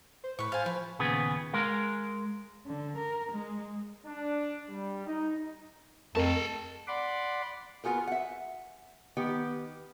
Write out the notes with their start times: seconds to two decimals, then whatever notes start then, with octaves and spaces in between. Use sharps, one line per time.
0.24 C5
0.39 A2 B4 C#6
0.52 C5 F5 G#5 A6
0.66 F3 B4
0.99 D#2 A#2 C#3 B3 G#4 B4
1.53 G#3 A#4 F5
2.66 D3
2.97 A#4
3.32 G#3
4.05 D4
4.69 G3
5.06 D#4
6.15 F2 A3 G#4 A#4 A5
6.88 D5 F#5 B5 C6 D6
7.84 B3 F4 F#4 G#4 A#4
8.07 E5 F#5
9.17 D#3 B3 G4